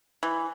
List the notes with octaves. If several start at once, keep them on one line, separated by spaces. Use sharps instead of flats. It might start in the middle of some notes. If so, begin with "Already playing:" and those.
E3